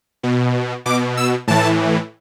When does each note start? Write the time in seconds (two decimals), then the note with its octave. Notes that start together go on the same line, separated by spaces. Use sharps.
0.23 B2
0.86 B2 D6
1.17 E6
1.47 A2 E3 A5